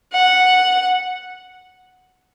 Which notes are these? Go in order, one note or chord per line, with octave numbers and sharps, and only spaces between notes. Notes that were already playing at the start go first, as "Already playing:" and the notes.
F#5